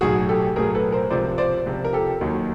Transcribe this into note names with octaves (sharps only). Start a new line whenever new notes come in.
B1 A2 F#3 F#4 G#4
G4 A4
B1 A2 F#3 G#4 A#4
A4 B4
A#4 C5
C#2 C3 F3 C5 D5
C5 D5
C#2 C3 F3
A#4
G4 A4
D#2 D#3 F#3